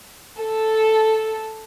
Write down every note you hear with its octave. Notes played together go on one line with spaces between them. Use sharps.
A4